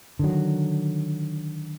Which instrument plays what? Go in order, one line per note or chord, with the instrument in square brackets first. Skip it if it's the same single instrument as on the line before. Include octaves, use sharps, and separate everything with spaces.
[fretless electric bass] D3 D#3 F#3